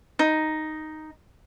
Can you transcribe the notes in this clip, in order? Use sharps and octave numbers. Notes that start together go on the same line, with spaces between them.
D#4